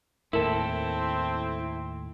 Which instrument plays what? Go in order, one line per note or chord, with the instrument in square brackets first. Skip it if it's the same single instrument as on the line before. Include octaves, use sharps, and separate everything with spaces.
[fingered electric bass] D#2 A2 [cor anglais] C4 [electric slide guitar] E4 A4 [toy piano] A#4